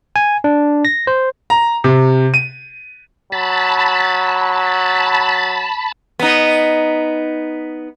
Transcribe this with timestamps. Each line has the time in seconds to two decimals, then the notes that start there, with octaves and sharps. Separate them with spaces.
0.16 G#5
0.44 D4
0.85 A#6
1.07 C5
1.50 A#5
1.84 C3
2.34 D#7
3.32 F#3 A5 B5
6.19 B3 D#4